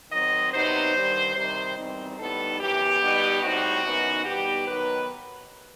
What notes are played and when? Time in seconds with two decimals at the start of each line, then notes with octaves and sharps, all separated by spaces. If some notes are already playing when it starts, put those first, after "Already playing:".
0.11 D#3 F#3 C4 D#5
0.54 C3 F#3 B3 D#4 C5
0.95 G2 D#3 G3
1.35 C3 D#3 G3 D#4 C5
1.77 E2 D#3 G3 C4 D#4
2.19 A2 G3 B3 D#4 A4
2.60 F#2 E3 B3 G4
3.02 B2 G3 B3 D#4
3.42 A2 G3 C4 D#4 F#4
3.84 F#2 E3 B3 D#4
4.25 B2 G3 B3 D#4 G4
4.67 D#3 F#3 B3 D#4 B4